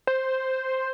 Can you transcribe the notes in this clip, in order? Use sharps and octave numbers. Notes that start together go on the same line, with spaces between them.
C5